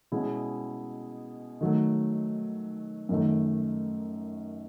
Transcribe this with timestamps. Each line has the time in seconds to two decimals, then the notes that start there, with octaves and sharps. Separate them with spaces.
0.12 B2 G#3 C#4 E4
1.61 D#3 F#3 A3
3.09 F#2 D#3 A3